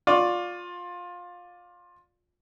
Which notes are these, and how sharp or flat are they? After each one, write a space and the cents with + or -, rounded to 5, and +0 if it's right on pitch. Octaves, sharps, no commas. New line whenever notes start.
F4 +20 D5 +0 C#6 +0